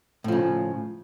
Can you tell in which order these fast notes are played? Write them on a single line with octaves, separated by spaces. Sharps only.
A2 F3 C#3